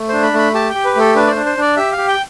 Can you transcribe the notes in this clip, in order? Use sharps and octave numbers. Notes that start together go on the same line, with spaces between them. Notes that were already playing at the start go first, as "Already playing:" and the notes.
Already playing: A3
D4 C5
B5
A3 B5
G4 A5
G4 G5
B4
A3 A4
D4 B4
D5
D4 C5
C5
D4 D5
G4 E5
F5
G4
G5